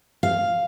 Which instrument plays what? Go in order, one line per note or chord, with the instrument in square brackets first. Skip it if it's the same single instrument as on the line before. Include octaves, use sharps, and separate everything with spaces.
[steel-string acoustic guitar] F5